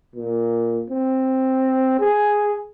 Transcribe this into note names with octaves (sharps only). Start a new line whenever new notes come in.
A#2
C4
G#4